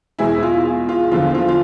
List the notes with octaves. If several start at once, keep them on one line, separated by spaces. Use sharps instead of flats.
E2 B2 G#3 E4 G#4
F4
F4
E2 D3 F3 F4
F4
F4